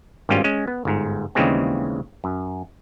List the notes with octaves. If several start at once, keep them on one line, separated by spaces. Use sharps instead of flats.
G#1 G2 G3 C#4 F4
G#3 C#4
B3
G1 G#2
D#2 C#3 E3 G3 G#3 C4
F#2